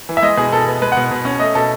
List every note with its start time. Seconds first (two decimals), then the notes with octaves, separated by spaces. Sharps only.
0.09 E3
0.17 E5
0.22 G#3 D#5
0.37 B2 G#4
0.53 B2 A4
0.67 B3
0.82 G#3 B4
0.92 B2 F#5
1.11 B2
1.25 C#4
1.40 A3 D#5
1.55 B2 A4